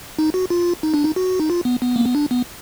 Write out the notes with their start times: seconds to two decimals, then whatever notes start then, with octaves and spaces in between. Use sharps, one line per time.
0.19 D#4
0.34 F#4
0.50 F4
0.83 D#4
0.94 D4
1.04 D#4
1.16 F#4
1.40 D#4
1.50 F4
1.65 B3
1.82 B3
1.96 A#3
2.06 B3
2.15 D4
2.31 B3